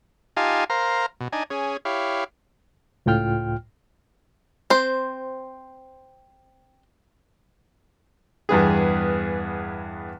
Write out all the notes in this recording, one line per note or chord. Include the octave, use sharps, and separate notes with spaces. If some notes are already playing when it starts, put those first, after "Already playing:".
D#4 F4 G4 F5 G#5 A5
A#4 C5 F5 A#5
B2
D4 D#4 G#5
C#4 G#4
E4 G4 C#5 F5
C#2 A2 F4 G5 F6
C4 C5
E2 G2 B3 G#4